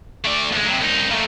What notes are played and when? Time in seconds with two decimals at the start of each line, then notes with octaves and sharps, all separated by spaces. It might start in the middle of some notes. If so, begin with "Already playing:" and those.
0.25 A3 D5
0.52 D2 G#3
0.66 C3 F#3
0.81 C2 D#4
1.10 A#2 A3